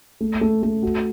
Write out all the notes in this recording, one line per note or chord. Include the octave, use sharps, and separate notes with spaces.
A3
A3
A3
F#4